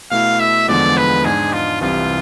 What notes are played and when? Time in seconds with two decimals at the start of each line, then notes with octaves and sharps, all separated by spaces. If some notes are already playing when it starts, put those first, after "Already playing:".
0.11 B2 A3 E4 F5
0.40 E5
0.68 E2 D3 F3 G#3 B3 D5
0.97 B4
1.25 G#2 G#3 D4 G#4
1.53 F4
1.81 C2 C3 E3 F4